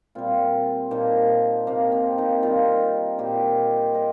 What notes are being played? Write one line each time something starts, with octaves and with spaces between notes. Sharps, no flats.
A#2 G3 C4 F4
A#2 F3 A#3 D#4
C3 F3 A#3
C4
A#3 D#4
C3 D#3 G3 F4 A#4
A#2 G3 G4 C5
F3 A#4 D#5